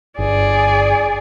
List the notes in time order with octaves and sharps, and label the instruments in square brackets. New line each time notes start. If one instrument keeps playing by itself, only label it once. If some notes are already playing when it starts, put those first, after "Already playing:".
[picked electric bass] G1 [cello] G#4 [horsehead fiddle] D5